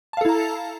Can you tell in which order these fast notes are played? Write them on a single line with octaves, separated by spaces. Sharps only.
A5 F5 A4 E4 A#5